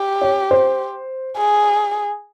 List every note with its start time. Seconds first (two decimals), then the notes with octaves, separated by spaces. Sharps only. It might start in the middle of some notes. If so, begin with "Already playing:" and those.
Already playing: G4
0.21 C#5
0.51 C5
1.37 G#4